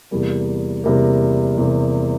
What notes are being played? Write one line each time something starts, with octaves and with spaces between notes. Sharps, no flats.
E2 C3 G3 A#3
E2 C3 G3 A#3
E2 C3 G3 A#3